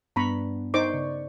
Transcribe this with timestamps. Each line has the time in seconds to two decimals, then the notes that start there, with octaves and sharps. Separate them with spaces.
0.16 G2 B3 D4 A#5 B5 C#6
0.74 D#4 C5 D5 C#6 D6
0.94 C#3